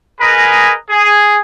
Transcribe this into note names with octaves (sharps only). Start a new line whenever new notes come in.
G#4 A#4 B4 D#5 G#5
G#4